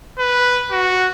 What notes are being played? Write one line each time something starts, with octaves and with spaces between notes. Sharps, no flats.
B4
F#4